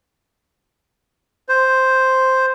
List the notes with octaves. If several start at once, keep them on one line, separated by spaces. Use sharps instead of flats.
C5